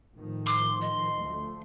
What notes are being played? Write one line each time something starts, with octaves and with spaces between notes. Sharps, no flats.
A2 D#3 F3
C6 D6
D#5
D2 F3 A3